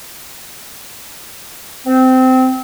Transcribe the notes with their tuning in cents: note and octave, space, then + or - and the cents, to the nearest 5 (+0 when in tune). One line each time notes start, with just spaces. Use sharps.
C4 -20